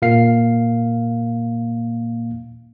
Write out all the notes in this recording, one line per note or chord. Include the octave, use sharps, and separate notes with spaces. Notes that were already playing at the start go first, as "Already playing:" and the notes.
A#2 A#3 F5 C7